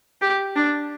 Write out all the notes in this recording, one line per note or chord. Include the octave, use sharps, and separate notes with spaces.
G4
D4